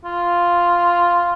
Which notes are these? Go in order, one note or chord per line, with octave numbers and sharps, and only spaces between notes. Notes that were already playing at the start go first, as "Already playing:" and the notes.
F4